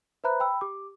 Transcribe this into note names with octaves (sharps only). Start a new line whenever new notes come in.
B4 C5 E5 A#5 B5 F#6
G5 B5 E6
G4 D6